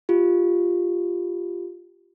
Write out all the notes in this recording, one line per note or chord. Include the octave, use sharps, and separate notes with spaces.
F4 G4